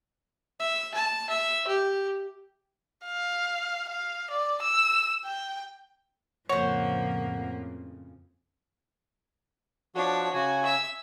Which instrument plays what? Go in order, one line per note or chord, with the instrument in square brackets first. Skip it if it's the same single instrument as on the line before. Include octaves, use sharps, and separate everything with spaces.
[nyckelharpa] E5
A5
E5
G4
[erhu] F5
F5
D5
E6
G5
[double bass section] F2 A2 C#3 [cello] F3 A#3 [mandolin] F#4 C5 [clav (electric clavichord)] C#5
[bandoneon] F3 F#4 [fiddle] D4 C#5
[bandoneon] C#3 G#5 [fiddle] F#4
[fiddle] E5 E6